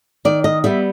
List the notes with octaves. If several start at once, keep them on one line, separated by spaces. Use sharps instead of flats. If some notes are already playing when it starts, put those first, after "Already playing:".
D#3 D5
D#5
G3 B3 E5